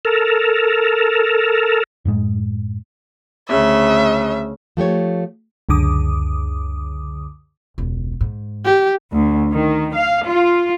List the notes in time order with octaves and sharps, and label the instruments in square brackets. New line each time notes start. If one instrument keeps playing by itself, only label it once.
[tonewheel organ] A4 A#4
[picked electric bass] F#2 A2 G#3
[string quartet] D2 C#3 [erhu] E5
[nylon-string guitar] F3 A3 G4 C#5
[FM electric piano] C#2 F#2 D3 D6 D#6
[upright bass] E1 C#2
G#2
[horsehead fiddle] G4
[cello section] D2
D#3
F5
F4